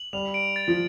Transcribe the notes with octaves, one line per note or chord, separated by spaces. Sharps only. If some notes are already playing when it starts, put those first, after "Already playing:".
Already playing: F#7
G3 F7
D7
A6
F3